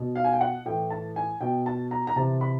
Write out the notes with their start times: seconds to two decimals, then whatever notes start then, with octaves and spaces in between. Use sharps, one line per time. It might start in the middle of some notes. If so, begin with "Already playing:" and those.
Already playing: B2
0.16 F5
0.24 G#5
0.33 G5
0.41 F#5
0.65 A2 E3 G5
0.90 A5
1.16 G#5
1.41 B2 G5
1.66 A5
1.91 A#5
2.07 A#5
2.16 C3 E3 A5
2.41 B5